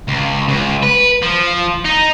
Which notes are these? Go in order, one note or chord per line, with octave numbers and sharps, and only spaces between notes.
C#2
C#2
B4
F3
D#4